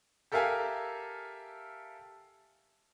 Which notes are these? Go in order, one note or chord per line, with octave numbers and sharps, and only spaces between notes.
G4 A4 A#4 E5 F5 G#5